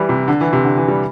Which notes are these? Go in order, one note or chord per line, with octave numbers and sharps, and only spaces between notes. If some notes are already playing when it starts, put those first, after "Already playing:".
Already playing: E3 G3
C3
D3
E3
C3
D3
E3
G3